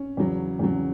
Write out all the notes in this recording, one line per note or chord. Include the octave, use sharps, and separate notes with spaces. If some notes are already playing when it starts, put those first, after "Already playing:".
Already playing: C#4
E2 C#3 F#3
E2 C#3 F#3